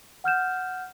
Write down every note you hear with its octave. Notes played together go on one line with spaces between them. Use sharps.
F#5 F6 G6 E7